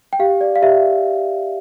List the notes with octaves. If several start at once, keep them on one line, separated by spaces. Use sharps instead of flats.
G5
G4 F5
D5
F5
G4 E5